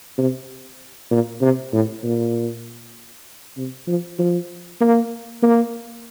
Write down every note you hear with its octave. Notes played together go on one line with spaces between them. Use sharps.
C3
A#2
C3
A2
A#2
C3
F3
F3
A#3
A#3